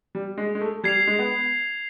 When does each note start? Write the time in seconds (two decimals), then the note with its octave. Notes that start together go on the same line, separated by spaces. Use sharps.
0.15 G3
0.38 G#3
0.55 G#3
0.61 A3
0.84 G3 G#6 C7 F7
1.07 G#3
1.19 B3